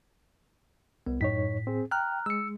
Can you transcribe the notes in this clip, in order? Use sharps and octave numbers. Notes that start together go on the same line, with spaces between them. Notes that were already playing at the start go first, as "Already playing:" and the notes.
C2 B3
F#2 A2 D#4 C#5 B6
C4 G#4
G5 A#5 F6 F#6
G#3 E6 C#7